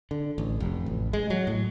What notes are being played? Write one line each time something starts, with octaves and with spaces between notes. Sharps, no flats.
D3
A1
F1
A1
G#3
F#3
A2